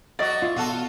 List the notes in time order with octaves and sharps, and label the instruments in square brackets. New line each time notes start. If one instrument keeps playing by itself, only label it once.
[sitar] F#3 F#4 [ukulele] D5 D#5
[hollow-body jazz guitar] E4 F4
[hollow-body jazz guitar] B2 [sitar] F4 F#4 A4